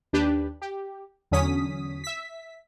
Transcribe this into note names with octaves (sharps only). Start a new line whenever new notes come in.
D#2 D4 G4 B4
G4
E2 D3 F#3 C#4 D#6 B6
E5 B6